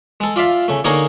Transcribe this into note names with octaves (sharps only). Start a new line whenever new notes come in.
G#3 A4
F4 D5 E5 F5
C#3 A3
D3 A#3 D#4 G#4 A#4 C#5